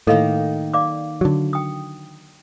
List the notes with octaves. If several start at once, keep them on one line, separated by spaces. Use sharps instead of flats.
A2 D#3 A#3 A4 D#5 F5
D5 F5 D6
D3 F#3
G5 D#6